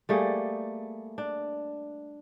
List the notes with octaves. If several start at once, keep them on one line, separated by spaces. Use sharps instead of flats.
G3 A3 A#3 G#4
D4